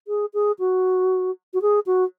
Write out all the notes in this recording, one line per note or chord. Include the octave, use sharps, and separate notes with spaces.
G#4
G#4
F#4
F#4
G#4
F#4